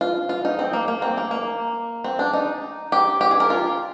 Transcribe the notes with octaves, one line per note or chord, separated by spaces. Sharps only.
F4
F4
D#4
C4
A#3
A#3
C4
A#3
A#3
C4
D4
D#4
G4
G4
G#4
A#4
F4